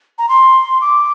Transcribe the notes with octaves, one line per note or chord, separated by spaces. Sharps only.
A#5
C6
D6